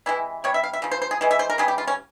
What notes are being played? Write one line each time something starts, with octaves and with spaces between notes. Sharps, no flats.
C3 E3 G#3 E4
C3 G3 C#5
E5
F5
E5
C#3 F3
C5
C5
G#4
E3 G#3
E5
C5
A#4
C#3 E3 G3 G#4
G4
F4
C#4